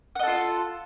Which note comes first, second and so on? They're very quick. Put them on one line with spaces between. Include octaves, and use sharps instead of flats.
F#5 D#5 A4 F4